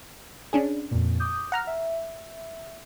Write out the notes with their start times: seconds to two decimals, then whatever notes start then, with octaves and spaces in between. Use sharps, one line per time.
0.53 C#4 D4 G#4
0.91 F2 A#2
1.20 D6 D#6 G6
1.52 F#5 A#5 F6
1.67 E5